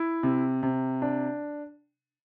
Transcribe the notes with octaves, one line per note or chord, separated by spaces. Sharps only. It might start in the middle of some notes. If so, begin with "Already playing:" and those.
Already playing: E4
C3
C3
D4